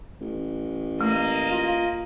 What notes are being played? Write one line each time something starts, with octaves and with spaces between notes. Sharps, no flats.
A1
A3 A#3 D#5
F4